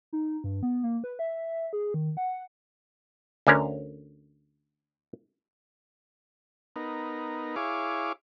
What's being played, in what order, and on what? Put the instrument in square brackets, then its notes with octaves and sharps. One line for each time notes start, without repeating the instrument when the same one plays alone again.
[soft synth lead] D#4
G2
B3
A#3
B4
E5
G#4
D#3
F#5
[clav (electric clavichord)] D2 D3 C#4 A#4
[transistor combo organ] B3 D#4 A#4
E4 G#4 C#5 F5 D6